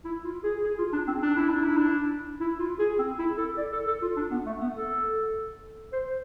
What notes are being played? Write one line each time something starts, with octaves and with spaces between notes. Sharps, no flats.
E4
F4
G#4
G#4
F4
D4
C4
D4
E4
D4
E4
D4
E4
F4
G#4
C4
E4
A4
D5
A4
A4
F4
D4
B3
A3
B3
A4
C5